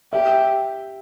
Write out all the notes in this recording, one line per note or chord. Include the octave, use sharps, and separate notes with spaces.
G4 E5